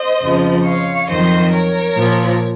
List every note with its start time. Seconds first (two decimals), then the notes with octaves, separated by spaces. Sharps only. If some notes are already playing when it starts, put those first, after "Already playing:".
Already playing: C5 D#5
0.22 F2 C#3 F3
0.65 C#5 F5
1.09 F2 D#3 F#3 C5 D#5
1.54 A#4 C#5
1.97 A#2 F3